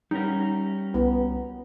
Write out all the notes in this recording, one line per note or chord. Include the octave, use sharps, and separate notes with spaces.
G3 C#4 D#4 A#4
C2 B3